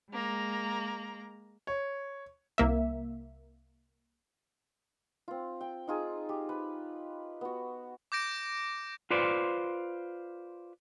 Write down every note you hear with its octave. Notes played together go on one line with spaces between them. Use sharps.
G#3 A#3 A#5
C#5
C2 A#3 E5
C4 F4
G5
D#4 F4 G#4
G4
B4
B3 F#4
D6 G6 A#6 D7
F4 B4 C5 D5